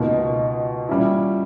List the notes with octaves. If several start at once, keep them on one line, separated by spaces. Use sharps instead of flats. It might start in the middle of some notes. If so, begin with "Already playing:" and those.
Already playing: C#2 B2 A#3 D#4
A#2 G3 C#4 E4